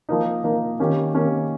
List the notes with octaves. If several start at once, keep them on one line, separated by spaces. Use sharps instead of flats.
F3 A#3 D#4
F3 A#3 D#4
D#3 A#3 C#4 G4
D#3 A#3 C#4 G4